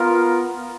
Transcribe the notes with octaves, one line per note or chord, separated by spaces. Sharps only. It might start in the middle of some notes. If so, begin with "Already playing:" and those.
Already playing: B3 F4 A#4